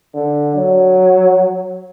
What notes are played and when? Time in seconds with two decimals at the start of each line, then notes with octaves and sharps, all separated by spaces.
0.14 D3
0.55 F#3